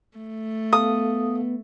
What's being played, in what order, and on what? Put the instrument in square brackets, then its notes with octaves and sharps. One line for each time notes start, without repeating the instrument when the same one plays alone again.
[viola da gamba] A3
[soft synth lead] B3 [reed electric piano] A4 F5 [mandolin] D#6